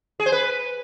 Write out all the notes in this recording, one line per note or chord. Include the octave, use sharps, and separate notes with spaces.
G#4
C5
B4